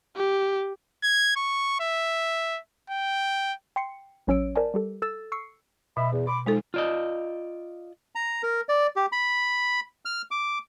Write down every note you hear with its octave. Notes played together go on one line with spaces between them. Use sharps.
G4
G#6
C#6
E5
G5
G5 C6 C7 C#7
A1 F#3 C#4 C#5 E6 D7
A#4 C5 D5 E5 G#5 A5
G3 G4 A4
A4 E6 A6 E7
C#6 E6 C7 C#7
B2 D#5 E5 B5
E2
B5 C6 D6
F3 G#3 D#4 A4
F4 D5 D#5
A#5
A#4
D5
G4
B5
F6
D6